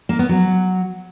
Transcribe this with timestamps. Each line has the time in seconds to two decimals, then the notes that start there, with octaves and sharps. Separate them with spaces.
0.09 A#3
0.19 B3
0.29 F#3